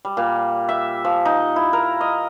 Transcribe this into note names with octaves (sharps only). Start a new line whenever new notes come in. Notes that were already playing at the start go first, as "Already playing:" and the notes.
G3
A#2
E5
F3
D#4
E4
A#4
D#5